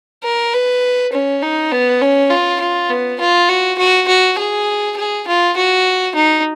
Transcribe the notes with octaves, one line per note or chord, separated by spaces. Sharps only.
A#4
B4
C#4
D#4
B3
C#4
F4
F4
B3
F4
F#4
F#4
F#4
G#4
G#4
F4
F#4
D#4